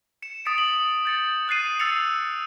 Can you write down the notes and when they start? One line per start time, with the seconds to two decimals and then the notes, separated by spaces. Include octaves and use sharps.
0.22 C#7 E7
0.45 D#6 A6 B6 C#7 D7
0.58 F#7
1.05 G6 A6 C#7
1.48 D#6 F#6 A6 C7 D#7
1.79 E6 A6 C7 C#7 F7